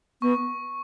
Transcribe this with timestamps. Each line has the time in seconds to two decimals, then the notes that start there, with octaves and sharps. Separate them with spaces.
0.22 B3 C#6